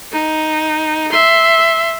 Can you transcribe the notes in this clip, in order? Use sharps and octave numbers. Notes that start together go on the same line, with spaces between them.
D#4
E5 C6